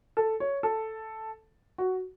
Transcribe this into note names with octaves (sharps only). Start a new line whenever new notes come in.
A4
C#5
A4
F#4